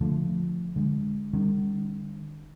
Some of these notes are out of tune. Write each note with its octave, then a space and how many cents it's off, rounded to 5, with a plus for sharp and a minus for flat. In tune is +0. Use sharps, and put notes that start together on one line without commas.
D3 +0 F3 +0 A3 +0
D3 +0 G#3 -10
D#3 -45 G3 +35 C#4 -10